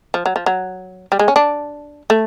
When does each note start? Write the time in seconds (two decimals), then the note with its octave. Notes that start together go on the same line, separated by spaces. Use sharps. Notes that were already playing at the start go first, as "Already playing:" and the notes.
0.14 F3
0.26 F#3
0.36 F3
0.46 F#3
1.12 G3
1.19 G#3
1.28 C#4
1.36 D4
2.10 A3